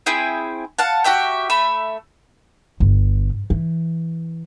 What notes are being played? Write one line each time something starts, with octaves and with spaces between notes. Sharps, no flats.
C4 E4 G#4 G5
F5 F#5 A5
F#4 G4 E5 G5
A3 E5 B5
G1
E3